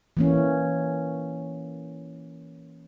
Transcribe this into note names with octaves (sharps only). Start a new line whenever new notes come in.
E3 A#3 C#4